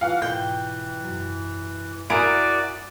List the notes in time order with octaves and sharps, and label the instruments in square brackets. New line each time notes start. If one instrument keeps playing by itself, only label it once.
[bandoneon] E3 [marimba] F4 B4 [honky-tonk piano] F5 F#5
[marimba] G#2 B2 [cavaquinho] G5 [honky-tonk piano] G6
[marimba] F#2 F#3
[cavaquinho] E4 G#4 A#4 [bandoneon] F#4 D5 [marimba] F#5 G#6 [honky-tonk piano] D7